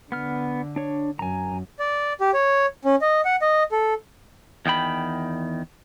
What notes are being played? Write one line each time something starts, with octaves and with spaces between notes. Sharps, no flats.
D3 B3 F6
D4 C#5
F#2 G#5 A#5
D5
G4
C#5
C#4
D#5
F#5
D#5
A4
E2 D#3 G5 B5